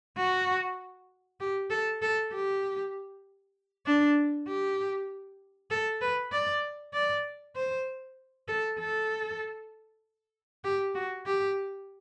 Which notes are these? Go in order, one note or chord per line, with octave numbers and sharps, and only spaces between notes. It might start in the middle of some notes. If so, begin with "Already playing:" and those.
F#4
G4
A4
A4
G4
D4
G4
A4
B4
D5
D5
C5
A4
A4
G4
F#4
G4